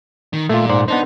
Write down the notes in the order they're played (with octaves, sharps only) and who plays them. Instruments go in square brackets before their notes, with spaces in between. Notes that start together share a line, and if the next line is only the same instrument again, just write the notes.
[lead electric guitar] D#3
[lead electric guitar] A#2 [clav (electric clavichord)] A3 F4
[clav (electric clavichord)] G#2 C5 D5
[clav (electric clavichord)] B3 D4 C5 [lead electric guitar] D#4